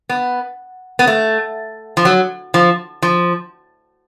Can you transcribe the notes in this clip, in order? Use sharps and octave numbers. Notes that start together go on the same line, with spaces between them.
B3
B3
A3
F3
F#3
F3
F3